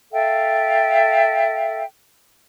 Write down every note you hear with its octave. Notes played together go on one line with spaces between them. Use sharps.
A4 E5 F5 G5